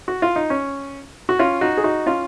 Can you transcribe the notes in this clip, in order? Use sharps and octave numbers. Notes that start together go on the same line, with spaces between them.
F#4
F4
D#4
C#4
F#4
C#4 F4
D#4 F#4
G#4
D#4 F#4
C#4 F4